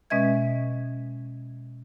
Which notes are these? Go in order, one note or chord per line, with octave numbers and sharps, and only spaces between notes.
B2 G#3 C#4 D#5 E5 G#6